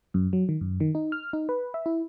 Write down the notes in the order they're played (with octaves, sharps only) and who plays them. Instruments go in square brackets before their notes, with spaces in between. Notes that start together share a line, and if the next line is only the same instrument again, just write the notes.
[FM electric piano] F#2
F#3
D#3
F#2
D#3
D#4
F6
D#4
B4
E5
E4